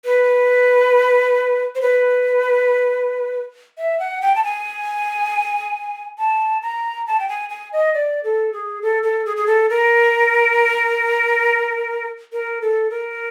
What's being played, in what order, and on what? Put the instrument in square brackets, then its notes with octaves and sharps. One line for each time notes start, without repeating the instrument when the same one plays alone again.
[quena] B4
C5
B4
E5
F#5
G5
A5
G#5
A5
A#5
A5
G5
G#5
G#5
D#5
D5
A4
G#4
A4
A4
G#4
G#4
A4
A#4
A#4
A4
A#4